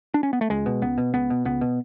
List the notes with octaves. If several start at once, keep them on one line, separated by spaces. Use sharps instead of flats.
D4
C#4
B3
A3
C#2 G#3
B2
C#2 B3
B2
C#2 B3
B2
C#2 B3
B2